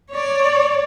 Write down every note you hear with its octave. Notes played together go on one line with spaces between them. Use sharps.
C#5 D5